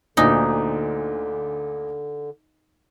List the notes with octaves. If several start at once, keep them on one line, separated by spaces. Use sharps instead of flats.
D2 A#2 D3 D#4